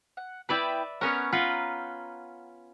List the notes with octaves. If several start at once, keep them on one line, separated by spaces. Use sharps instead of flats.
F#5
B3 E4 B4 D5 E5 G5
B3 C#4 A#4 C#5 F#5
F4 B4 F#5 A#5